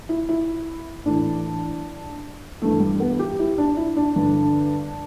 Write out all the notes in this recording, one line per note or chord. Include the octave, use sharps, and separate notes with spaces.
E4
E4
A2 E3 D4
G2 E3 A3
G3
B3
G4
E4
D4
E4
D4
G2 D3